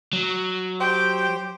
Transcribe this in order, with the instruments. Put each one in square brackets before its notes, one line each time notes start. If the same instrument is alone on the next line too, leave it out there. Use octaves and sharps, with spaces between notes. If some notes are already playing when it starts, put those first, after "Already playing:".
[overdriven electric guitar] F#3
[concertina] G4 C5 [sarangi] G5